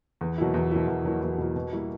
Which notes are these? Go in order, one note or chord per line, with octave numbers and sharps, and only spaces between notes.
E2
B2 F#3 A#3 E4
E2
B2 F#3 A#3 E4
E2
B2 F#3 A#3 E4
E2
B2 F#3 A#3 E4
B2
G3 A#3 E4